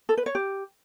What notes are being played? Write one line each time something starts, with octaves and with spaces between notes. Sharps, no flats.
A4
B4
C#5
G4